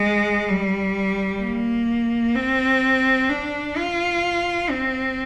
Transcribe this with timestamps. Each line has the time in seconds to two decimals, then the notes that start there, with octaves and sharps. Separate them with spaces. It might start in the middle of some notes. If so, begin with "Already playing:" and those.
Already playing: G#3
0.48 G3
1.41 A#3
2.35 C4
3.29 D4
3.76 F4
4.70 C4